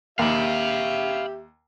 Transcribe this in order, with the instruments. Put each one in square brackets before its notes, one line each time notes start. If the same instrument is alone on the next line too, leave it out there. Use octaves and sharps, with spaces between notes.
[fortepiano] D#2 [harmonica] G4 E5 [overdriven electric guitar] F5 B5